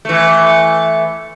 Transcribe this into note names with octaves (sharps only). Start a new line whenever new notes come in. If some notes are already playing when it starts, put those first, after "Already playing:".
E3 A3